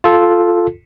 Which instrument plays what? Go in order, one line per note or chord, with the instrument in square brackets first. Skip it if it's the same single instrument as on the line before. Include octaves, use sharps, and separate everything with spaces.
[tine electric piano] F4 A4